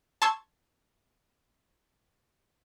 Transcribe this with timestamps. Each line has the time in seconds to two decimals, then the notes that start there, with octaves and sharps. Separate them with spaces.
0.22 A5 C6 C#6 E6 G#6